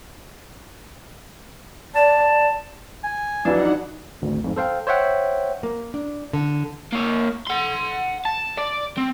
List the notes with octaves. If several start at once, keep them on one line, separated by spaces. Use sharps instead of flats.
D5 A5
G#5
F2 E3 F#3 D4 D#4 F#5
G#1 D2
F2 G#2
A4 C5 F5 G5
C5 C#5 E5 F#5 G5
A#3
D4
D3
A#3 C#5
F#5 C6
A5
D5
C4